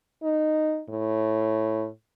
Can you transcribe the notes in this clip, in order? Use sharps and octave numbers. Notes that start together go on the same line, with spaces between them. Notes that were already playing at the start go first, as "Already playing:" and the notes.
D#4
A2